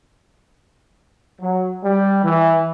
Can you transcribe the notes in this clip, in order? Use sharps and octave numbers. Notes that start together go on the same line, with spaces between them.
F#3
G3
E3